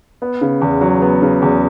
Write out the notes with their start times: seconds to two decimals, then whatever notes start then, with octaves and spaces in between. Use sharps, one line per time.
0.22 B3
0.41 C#3
0.61 E2
0.81 F#3
1.02 B3
1.22 C#3
1.42 E2